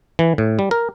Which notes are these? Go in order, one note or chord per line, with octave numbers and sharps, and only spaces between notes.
E3
A2
G3
A#4